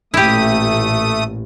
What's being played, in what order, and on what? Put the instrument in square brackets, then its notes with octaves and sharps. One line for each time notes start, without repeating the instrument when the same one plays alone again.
[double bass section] A1 A#2 [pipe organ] A3 D#6 [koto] E4 G4